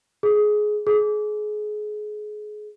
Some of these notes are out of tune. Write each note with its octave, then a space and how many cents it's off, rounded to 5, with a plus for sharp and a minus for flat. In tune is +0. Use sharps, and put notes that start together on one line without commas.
G#4 +15
G#4 +25